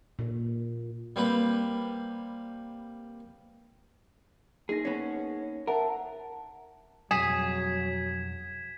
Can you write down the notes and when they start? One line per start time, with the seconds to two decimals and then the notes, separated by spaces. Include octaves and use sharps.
0.19 A#2
1.16 G3 A#3 C4 B4
4.69 A#3 D#4 G#4 A#6
4.85 B3 C#4
5.67 A#4 E5 F#5 A5
7.11 F2 B2 F#3 G3 G#4 G#6 B6 E7